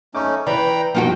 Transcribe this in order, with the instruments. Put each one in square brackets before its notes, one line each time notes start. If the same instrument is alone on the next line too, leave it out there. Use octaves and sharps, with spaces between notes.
[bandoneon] A3 C#4 D#4 [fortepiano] C#6 D6
[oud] E3 [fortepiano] B4 D5 [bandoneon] G5 A#5 B5
[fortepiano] G2 D3 F3 [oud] A#3 D#4 F#4 [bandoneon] G5